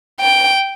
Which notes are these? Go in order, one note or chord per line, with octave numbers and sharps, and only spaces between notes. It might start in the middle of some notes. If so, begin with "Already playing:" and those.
G5